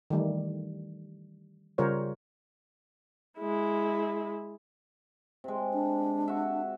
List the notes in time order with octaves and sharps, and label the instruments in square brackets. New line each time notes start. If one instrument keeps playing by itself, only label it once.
[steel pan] D#3 E3 G3 A3
C#3 G3 F4 A#4 C5 C#5
[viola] G#3 E4
[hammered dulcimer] C3 G#3
[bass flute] D4
[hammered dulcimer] F#4 E5 F#5